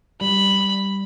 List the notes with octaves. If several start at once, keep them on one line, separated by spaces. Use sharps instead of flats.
G3 B5